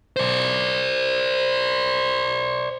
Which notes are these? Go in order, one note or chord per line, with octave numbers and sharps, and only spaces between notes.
C5 D5